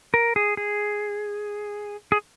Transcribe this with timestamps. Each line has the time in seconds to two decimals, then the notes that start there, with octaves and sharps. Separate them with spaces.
0.14 A#4
0.36 G#4
0.57 G#4
2.12 G#4